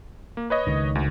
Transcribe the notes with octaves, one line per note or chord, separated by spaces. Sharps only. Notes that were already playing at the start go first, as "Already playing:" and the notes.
A#3
B4 C#5 D#5
C#2 D#3
D2